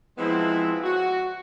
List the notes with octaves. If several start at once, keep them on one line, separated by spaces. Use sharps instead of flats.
E3 F3 G#3 B3 C4 E4
F#4